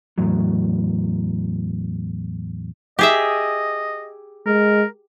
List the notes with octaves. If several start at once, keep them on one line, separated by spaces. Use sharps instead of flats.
E2 A2 F#3
G4 G#4 D#5 E5
G#3 A#4